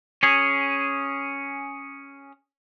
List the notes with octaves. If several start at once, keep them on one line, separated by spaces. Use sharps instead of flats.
C#4 G#4